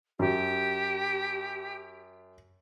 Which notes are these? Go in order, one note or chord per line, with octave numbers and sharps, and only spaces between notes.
F#2 G4